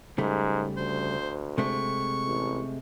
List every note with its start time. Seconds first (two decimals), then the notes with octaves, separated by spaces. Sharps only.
0.18 G#2 C#3 G3 A3
0.77 D2 C5
1.58 C3 G#3 A3 C#6
2.27 A1